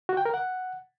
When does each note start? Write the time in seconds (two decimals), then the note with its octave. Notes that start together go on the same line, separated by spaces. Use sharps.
0.09 F#4
0.17 G5
0.25 A#4
0.34 F#5